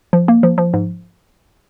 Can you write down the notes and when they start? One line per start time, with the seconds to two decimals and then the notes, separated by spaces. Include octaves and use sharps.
0.13 F3
0.28 A#3
0.43 F3
0.58 F3
0.74 G#2